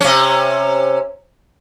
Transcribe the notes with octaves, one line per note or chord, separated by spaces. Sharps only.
C3 C#4